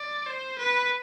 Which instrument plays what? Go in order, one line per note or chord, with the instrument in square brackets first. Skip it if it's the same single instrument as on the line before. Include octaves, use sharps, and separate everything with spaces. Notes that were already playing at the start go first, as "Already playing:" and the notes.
Already playing: [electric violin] D5
C5
B4